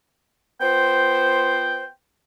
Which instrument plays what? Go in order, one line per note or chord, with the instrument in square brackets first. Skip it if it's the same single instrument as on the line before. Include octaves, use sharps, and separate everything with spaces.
[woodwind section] B3 F4 C5 [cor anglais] G5